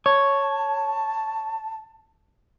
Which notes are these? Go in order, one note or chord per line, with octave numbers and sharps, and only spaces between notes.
C#5 A5